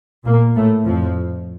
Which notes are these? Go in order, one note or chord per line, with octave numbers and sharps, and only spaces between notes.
A#2 A#3
A2 A3
F2 F3